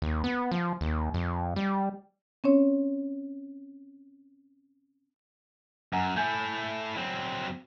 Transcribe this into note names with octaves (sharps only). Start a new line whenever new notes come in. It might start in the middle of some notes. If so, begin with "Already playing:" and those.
D#2
B3
F3
D#2
F2
G3
C4 C#4 C#5
F#2 F#5 G#5 A#5
A3 E4 G#5 G6 G#6
F#3 C4